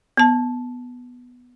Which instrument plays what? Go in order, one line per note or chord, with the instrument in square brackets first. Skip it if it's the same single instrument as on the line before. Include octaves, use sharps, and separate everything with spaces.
[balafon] B3 A5